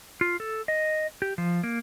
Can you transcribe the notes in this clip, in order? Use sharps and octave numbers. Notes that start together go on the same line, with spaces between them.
F4
A4
D#5
G4
F3
A#3